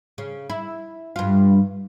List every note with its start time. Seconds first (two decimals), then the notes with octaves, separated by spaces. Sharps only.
0.18 C#3
0.50 E4
1.16 G2 F4